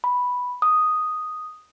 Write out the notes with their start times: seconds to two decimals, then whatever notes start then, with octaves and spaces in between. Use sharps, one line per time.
0.04 B5
0.62 D#6